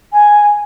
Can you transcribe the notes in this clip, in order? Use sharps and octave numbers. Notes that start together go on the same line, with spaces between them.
G#5